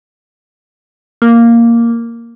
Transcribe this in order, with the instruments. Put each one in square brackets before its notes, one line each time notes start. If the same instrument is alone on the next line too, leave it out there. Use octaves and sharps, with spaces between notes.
[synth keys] A#3